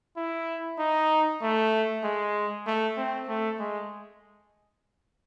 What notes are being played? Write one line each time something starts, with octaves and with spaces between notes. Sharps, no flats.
E4
D#4
A3
G#3
A3
C4
A3
G#3